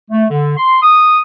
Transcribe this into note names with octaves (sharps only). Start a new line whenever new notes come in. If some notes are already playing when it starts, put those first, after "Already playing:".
A3
D3
C6
D#6